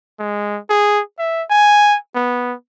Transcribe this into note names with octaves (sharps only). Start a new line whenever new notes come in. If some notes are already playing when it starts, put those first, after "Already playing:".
G#3
G#4
E5
G#5
B3